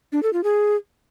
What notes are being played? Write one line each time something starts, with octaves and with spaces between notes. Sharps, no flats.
D4
A4
F4
G#4